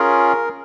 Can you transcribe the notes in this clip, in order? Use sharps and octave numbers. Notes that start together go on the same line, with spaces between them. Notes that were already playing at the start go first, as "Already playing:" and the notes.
Already playing: C#4 F4 G#4 A#4